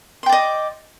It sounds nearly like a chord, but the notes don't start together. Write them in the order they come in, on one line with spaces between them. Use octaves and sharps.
C6 G5 D5 D#5